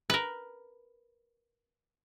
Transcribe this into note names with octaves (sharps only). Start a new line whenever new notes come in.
A#4 B4